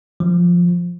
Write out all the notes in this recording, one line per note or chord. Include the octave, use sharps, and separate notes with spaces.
F3